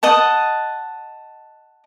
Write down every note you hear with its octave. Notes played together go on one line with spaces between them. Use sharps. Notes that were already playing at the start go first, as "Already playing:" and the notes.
D#5 F#5 A5